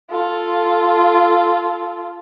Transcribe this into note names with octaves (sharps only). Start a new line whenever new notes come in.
F4 A4